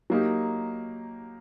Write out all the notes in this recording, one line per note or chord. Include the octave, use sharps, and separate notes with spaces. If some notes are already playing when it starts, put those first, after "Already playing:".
F#3 A#3 D#4 G4